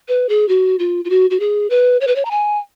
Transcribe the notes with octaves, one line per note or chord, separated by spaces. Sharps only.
B4
G#4
F#4
F4
F4
F#4
F#4
G#4
B4
C#5
B4
C#5
A#5
G#5